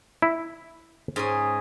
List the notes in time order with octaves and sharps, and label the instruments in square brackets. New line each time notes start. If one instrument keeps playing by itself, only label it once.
[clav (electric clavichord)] E4
[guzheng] G#2 C#4 G#4